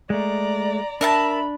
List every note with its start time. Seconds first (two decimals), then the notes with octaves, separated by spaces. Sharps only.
0.10 G#3 A3 D5 A#5
1.01 D4 A#4 E5 A5 B5